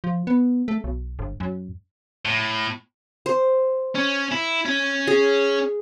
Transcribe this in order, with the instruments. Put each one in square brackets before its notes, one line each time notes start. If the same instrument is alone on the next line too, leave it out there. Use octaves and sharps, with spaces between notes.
[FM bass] F3
B3
A3
B1
G1
F#2
[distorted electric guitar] A2
[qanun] C5
[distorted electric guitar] C#4
E4
C#4
[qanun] G#4